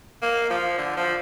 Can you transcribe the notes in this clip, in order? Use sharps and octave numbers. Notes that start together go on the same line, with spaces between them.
A#3
F3
D3
F3